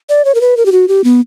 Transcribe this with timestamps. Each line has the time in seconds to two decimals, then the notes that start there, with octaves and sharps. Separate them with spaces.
0.09 D5
0.25 C#5
0.35 A#4
0.41 B4
0.57 A#4
0.66 G4
0.72 F#4
0.88 G4
1.04 B3